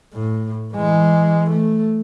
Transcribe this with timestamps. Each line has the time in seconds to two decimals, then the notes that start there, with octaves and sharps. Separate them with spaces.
0.13 A2
0.74 E3 G#3
1.51 A3